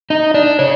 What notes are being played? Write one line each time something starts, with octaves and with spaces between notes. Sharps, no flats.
D#4 D#5
D4 D5
C#3 C#5